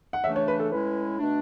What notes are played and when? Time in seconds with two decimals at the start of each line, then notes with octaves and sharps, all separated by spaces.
0.13 F#5
0.24 C#3 E3 A3 D4 E5
0.36 C#5
0.48 B4
0.60 A4
0.71 A2 G#3 C#4 E4 B4
1.19 B2 A3 D4